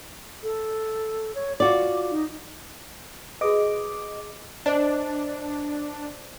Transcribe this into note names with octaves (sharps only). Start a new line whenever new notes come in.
A4
C#5
F4 F#4 D5 D6
D#4
F#4 G#4 B4 D#5 D6
D4 C5 D5 D#5